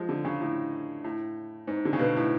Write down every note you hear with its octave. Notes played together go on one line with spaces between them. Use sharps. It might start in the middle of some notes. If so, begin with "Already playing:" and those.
Already playing: F3 G#3
D3
C#3
A2
A2
G#2
D3
C#3
B2
A2